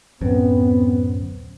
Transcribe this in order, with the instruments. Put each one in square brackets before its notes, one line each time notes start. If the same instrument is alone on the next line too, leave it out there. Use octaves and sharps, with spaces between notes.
[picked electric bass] D1 F#2 [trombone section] B3 C4